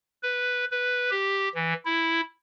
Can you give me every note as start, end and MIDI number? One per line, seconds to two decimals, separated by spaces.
0.23 0.65 71
0.71 1.10 71
1.11 1.49 67
1.55 1.73 52
1.85 2.21 64